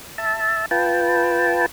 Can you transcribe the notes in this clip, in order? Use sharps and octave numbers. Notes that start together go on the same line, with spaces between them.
E5 A5
F4 B4 G5 A5